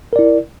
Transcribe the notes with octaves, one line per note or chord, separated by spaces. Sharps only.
E4 A#4 D5